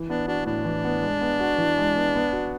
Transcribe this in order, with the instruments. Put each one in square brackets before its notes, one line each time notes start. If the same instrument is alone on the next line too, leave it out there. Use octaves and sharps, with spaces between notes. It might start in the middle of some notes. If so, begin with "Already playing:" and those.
Already playing: [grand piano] E3
[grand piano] B3 [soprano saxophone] D4
[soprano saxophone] D4 [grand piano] F#4
[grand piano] A2 [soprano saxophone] D4
[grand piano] E3
B3
G#3
B3
F#4
E3
G#3
B3
B3
F#4